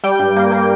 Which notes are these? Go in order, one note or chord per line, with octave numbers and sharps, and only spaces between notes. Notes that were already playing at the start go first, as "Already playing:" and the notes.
G3 G5
G2
A#3
A#3